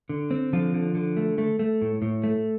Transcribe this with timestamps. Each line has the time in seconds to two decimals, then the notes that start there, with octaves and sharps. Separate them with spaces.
0.09 D3
0.31 C4
0.53 D3 F3 F4
0.74 D3
0.95 D3
1.17 A3
1.38 A3
1.59 A3
1.82 A2
2.02 A2
2.24 A3